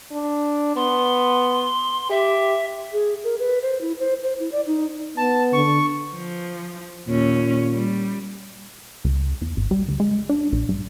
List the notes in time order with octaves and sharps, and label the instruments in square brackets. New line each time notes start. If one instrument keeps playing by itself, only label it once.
[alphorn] D4
[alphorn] B3 [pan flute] C6
[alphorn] G4 [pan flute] E5
[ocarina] G#4
A#4
B4
C5
E4
C5
C5
E4
D5
D#4
[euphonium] B3 [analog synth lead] A5
[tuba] D3 [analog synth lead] C#6
[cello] F3
[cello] D#2 C#4 [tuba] A#2
[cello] G3
[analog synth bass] C#2
E2
G#1
G3
D2
G#3
D4
A#1
G2